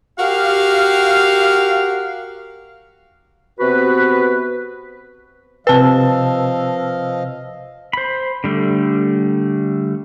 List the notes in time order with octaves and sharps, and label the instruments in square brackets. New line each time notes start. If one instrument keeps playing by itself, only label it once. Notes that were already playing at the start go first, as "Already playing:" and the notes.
[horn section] F#4 G4 A#4 F5
[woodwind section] C3 B3 F#4 B4
[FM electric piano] C3 E6 [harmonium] F3 D#5 F5 [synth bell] B4 A5
[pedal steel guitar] C5 B5
D3 G3 A3